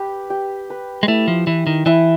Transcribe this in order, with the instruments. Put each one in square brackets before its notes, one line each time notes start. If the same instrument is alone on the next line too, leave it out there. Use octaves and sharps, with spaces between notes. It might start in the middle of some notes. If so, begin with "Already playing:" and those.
Already playing: [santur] G4 B4
G4
B4
[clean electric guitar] G#3
[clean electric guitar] A3 [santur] E4
[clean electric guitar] F3
[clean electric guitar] E3 [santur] E4
[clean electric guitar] D#3
[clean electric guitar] E3 [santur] E4